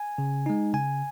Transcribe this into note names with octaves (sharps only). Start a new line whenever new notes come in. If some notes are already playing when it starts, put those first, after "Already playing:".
Already playing: G#5
C#3
G#3 D#4
C#3 G#5